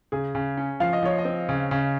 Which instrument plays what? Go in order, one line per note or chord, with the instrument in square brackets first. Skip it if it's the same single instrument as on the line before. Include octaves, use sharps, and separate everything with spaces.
[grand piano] C#3 [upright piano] G#4
[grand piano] C#3
C#4
[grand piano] F3 [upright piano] F5
[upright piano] D#5
[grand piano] F3 [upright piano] C#5
[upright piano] D#5
[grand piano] C4
C#3
C#3